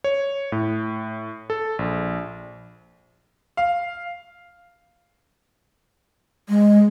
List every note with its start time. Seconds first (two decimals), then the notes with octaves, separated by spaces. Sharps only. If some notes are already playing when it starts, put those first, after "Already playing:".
0.04 C#5
0.52 A2
1.50 A4
1.79 A#1
3.57 F5
6.49 G#3